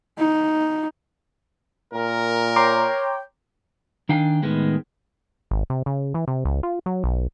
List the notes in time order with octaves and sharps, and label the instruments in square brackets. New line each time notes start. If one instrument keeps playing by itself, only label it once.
[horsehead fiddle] D#4
[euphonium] A#2 [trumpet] A#4
[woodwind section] C#5 G5 [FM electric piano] A#5 C6 D6
[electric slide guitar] D#3 D4 F5 G5 G#5
A2 D#3 G#3 B3
[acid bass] G#1
C3
C#3
E3
C3
C#2
F4
F#3
B1